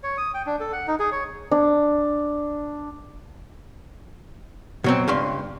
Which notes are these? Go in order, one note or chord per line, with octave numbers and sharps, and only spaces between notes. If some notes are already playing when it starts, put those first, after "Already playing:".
C#5
D#6
G5
D4
A4
F#5
D#4
G#4
C#5
D4
B2 F#3 C4
C#2 G2 C6